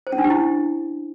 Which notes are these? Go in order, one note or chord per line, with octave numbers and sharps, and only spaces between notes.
C5
C#4
D4
G4
E4